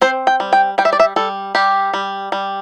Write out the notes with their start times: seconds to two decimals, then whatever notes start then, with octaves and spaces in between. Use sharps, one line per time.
0.01 C4 C5
0.27 G5
0.40 G3
0.53 G5
0.78 G3 G5
0.85 E5
0.93 D5
1.00 E5
1.16 G3 A4
1.55 G3 G4
1.94 G3
2.32 G3